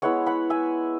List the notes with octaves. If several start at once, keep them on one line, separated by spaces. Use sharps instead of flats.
G#3 B3 E4 C#5 F#5
F#5 B5
E5 G#5